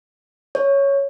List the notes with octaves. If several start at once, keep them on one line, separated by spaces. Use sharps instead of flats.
C#5